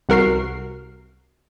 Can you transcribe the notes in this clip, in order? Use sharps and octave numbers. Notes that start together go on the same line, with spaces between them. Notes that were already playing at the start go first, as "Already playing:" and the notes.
C2 F#4 A#4 F6 C7